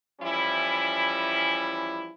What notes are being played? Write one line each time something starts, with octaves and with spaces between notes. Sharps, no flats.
E3 F3 G3 C#4 E4